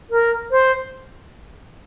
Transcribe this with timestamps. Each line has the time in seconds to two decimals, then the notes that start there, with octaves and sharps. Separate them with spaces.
0.10 A#4
0.50 C5